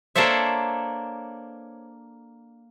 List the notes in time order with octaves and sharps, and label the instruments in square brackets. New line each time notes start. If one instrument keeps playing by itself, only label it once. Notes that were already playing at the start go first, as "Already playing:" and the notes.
[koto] A#3 D4 A4 C5 C#5 E5